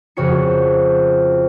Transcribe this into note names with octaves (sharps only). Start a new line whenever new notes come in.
F2 C#3 F#4 C#5 C#7